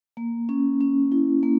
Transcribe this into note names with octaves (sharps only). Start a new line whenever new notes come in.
A#3
C#4
C#4
E4
A#3